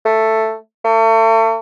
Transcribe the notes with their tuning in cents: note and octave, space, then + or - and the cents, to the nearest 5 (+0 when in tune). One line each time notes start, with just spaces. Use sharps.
A3 +5
A3 +35